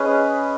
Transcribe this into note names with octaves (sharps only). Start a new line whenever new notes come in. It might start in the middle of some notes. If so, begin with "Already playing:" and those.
Already playing: C#4 G#4 B4 D#5